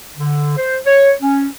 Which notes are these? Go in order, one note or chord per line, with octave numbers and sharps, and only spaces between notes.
D3
C5
C#5
C#4